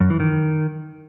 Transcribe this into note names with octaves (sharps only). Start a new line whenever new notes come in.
F#2
E3
D#3